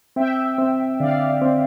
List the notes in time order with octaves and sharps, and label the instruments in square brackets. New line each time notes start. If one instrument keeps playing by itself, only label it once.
[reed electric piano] C4 [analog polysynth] E5 G5
[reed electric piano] C4
[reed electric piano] D3 [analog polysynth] D5 F5
[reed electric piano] C4